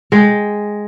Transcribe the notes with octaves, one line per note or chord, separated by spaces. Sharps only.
G#3 G5